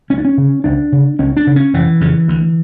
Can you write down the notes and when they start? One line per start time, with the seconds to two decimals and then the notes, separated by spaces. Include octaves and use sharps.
0.10 C#2 C#4
0.18 D4
0.25 C#4
0.37 C#3
0.64 C#2 D4
0.92 C#3
1.19 C#2 C#4
1.37 D4
1.47 C#3
1.56 C#4
1.73 F1 E3
2.01 F2 C#3
2.28 D2